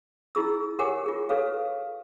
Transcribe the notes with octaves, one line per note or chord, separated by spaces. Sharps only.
E4 F4 G#4 E6
G4 A#4 C#5 F#5 G#5 D6
F4 G#4
G4 A4 B4 C#5 F5